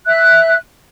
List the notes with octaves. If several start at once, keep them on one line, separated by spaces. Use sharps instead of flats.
E5 F#6